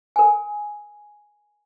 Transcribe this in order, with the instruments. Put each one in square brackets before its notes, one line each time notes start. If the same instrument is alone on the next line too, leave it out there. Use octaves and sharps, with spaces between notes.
[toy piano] A#4 G#5